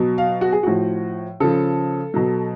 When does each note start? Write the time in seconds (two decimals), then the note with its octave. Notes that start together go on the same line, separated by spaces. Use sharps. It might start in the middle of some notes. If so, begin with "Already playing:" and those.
Already playing: B2 F#3
0.18 F5
0.41 F#4
0.52 G#4
0.63 A2 F3 F#4
1.40 C#3 F3 A4
2.14 B2 F#3